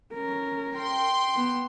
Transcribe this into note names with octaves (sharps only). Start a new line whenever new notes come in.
C#4 A#4
G5 C6
B3